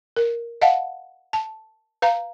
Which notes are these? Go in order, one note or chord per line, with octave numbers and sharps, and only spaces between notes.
A#4
D#5 F5 F#5 A5
A5
B4 F5 A#5